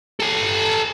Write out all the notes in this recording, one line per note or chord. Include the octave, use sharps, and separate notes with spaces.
A4 G#5